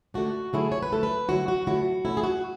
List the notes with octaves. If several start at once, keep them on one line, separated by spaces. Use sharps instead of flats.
D3 A3 D4 F#4
D3 F#3 A3 E4 G#4
C#5
B4
D3 F#3 A3 E4 A4
B4
D3 F#3 A3 E4 F#4
F#4
D3 F#3 A3 E4 F#4
B2 A3 C#4 E4
G#4
F#4